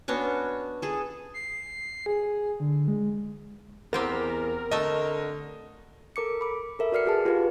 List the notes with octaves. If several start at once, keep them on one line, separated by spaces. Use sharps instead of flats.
B3 C#4 D4 F#4
G#4 A4
C7
G#4
D3
G#3
E2 B3 C4 G4 A#4
D3 A3 D#5 E5
A4 A#4 D6 C#7
B5 D6
A4 A#4 E5
F#4 B4 D5 F6 C7 C#7
F#4 G#4 A5
F4 G4 G#4 B4 D5 F5